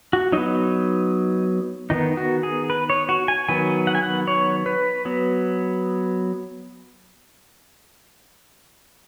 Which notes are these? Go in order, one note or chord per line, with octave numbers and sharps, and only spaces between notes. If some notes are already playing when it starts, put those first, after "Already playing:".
F#4
F#3 B3 D#4
D#3 B3 D#4
F#4
G#4
B4
C#5
F#4
G#5
D#3 F#3 B3 G#5
F#5
G#5
F#5
C#5
B4
F#3 B3